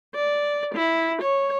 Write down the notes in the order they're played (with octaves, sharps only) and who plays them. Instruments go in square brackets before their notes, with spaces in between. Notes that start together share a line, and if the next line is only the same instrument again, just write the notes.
[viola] D5
E4
C#5